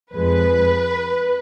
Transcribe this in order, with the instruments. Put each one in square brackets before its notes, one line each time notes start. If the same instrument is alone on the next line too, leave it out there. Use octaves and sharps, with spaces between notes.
[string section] F2 F3 G#3 B4